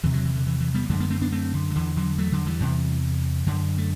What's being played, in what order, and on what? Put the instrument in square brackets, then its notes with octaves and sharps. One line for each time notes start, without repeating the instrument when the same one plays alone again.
[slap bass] E2 C3 E3
D3 F#3
E3
D3
E3
E3
G3 B3
F#2 D3 F#3 A3
G3 B3
A3 C4
B3 D4
A3 C4
D3
F#3
E2 D3 E3
D3 F#3
F#3 A3
D3 F#3
E3 G3
E2 C3
F#2 D3
A3